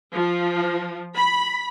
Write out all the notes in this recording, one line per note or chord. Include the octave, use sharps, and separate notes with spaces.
F3
B5